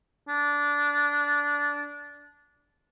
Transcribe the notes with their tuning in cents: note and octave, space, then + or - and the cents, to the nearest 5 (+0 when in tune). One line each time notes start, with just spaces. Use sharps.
D4 -15